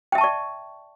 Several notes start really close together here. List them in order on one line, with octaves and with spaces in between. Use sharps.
G5 E5 A5 C#6 D5